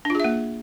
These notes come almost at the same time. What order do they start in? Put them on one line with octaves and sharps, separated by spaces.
D4 F4 G#4 E5 A#3